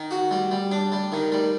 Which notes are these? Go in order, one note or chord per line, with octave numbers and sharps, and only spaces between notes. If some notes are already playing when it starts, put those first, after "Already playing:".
Already playing: D#3
F#4
G3
G3
D4
G3
D#3
G3